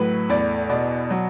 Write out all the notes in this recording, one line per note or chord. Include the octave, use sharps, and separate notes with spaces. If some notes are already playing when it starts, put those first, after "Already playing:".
Already playing: A2 F#3 B4
E2 D5
B2 D5
F#3